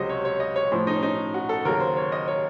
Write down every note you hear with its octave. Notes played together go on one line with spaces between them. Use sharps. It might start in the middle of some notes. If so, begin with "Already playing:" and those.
Already playing: C#2 C3 F#3 C5 D#5
C#5
C#5
D#5
C#5
A2 F3 C5
D#4
C#4
D#4
F#4
A4
D#2 C#3 F#3 A#4
C5
C#5
D#5
C#5